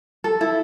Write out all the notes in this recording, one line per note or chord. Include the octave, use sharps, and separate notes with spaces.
A4
E4